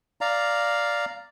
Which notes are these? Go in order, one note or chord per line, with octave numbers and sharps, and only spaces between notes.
D5 F5 A#5